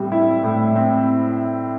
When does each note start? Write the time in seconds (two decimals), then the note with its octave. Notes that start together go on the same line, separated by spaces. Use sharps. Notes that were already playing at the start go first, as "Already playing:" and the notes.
Already playing: A2 G3 C4
0.12 E4
0.44 A2
0.76 C4